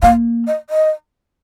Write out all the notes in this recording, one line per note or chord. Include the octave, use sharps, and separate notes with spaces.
A#3 F5
D#5
D#5